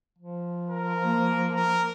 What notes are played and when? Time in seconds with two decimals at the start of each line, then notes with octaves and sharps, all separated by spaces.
0.18 F3
0.70 A#4
1.04 A#3
1.54 A#4